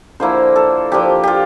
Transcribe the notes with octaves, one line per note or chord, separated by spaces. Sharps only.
D3 F3 A#3 E4 C5
A4
F3 A#3 D4 G4
F4 G4